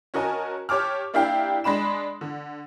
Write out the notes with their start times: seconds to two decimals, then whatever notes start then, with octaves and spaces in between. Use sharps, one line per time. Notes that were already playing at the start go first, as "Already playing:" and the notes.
0.14 C#4 F#4 A#4 D#5 G#5 A5
0.69 G4 C#5 A5 D6 F6
1.14 A#3 D4 E4 G4 F5 G5
1.64 G#3 D4 B5 E7
2.21 D3